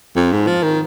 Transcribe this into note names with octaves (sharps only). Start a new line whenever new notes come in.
F2
G#2
F3
D#3